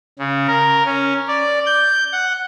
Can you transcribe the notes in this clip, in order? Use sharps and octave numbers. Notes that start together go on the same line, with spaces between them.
C#3
A#4
C#4
D5
G6
F#5